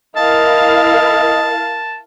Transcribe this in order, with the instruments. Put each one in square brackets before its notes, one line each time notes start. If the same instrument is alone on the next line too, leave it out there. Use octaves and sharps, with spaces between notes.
[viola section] E4 A#4 F5 [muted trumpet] D#5 [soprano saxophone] A5